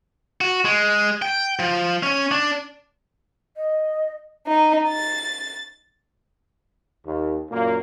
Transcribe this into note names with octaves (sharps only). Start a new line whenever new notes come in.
F#4
G#3
G5
F3
C#4
D4
D#5
D#4
A6
D#2
F#2 A#2 A#3